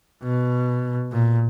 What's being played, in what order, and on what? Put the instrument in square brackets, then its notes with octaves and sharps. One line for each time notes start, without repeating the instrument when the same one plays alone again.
[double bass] B2
A#2